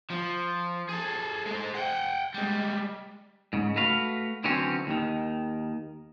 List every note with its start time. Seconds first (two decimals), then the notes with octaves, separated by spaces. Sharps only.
0.11 F3
0.89 G#4 A4
1.46 G#3 C5
1.75 F#5 G5
2.34 G3 G#3
3.53 G#2 C#3
3.76 A3 F#4 B4 F5
4.44 D3 E3 F#3 C4 C#4
4.87 D#2 D#3